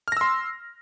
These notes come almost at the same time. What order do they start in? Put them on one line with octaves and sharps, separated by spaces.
F6 A#6 E6 C6